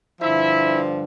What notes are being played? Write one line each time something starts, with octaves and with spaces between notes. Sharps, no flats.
G2 D3 F3 E4 E5